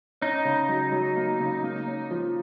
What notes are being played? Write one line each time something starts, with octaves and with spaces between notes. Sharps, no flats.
C#4 D#4
C#3
F#3
F#3
A#3
C#3
A#3
C#4
F3